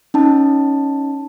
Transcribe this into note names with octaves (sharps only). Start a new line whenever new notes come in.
C#4 D#4 A5